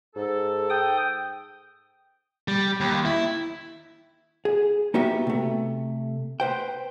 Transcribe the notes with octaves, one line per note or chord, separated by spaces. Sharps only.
G#2 A4
G5 D#6
G3
D#2
E4
G#4
A#3 B3 D#4 F#4 G4 E5
C3 A3
B4 C5 G5